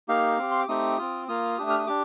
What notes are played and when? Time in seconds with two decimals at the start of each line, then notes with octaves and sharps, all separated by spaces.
0.08 A#3 D#4 G4 F5
0.38 C4 G4
0.52 C6
0.59 D6
0.68 A3 C4 D#4 G4 D#6
0.98 C4 F4
1.28 A#3 F4 D#6
1.58 A3 D4 G4
1.70 F6
1.79 D#6
1.87 D4 G4 D6